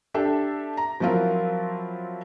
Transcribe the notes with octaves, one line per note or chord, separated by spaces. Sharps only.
D4 G4 A4 E5
A#5
F3 F#3 C4 E4 F4 A#4